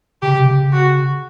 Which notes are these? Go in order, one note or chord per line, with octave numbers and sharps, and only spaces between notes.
C#3 G4
C3
C#3
F#4